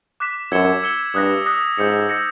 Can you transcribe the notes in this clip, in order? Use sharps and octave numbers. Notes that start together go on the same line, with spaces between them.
D6 F#6 B6 E7
F#2 E6 G#6 C#7 E7 G7
E6 G#6 C#7 E7 G7
G2 D#6 F#6 A#6
D#6 F#6 A#6
G#2 E6 G6 A#6 C#7
E6 G6 A#6 C#7